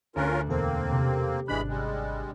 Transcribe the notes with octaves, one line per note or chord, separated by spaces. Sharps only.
D2 C#4 F4 A#4 F#6
E2 B2 A#3 C4 A4
C3
G#1 E3 G#3 D4 B5 F#6
G3 G#3